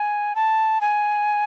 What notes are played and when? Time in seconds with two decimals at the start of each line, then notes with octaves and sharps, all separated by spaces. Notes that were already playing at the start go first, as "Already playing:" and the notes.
Already playing: G#5
0.36 A5
0.81 G#5